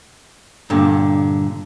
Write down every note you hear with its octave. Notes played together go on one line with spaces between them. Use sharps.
G2 A#2 D3